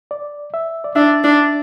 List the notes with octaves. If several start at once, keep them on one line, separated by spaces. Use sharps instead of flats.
D5
E5
D5
D4 E5
D4